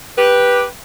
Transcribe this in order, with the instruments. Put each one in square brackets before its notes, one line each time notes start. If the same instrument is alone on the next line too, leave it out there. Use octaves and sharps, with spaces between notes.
[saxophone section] G4 B4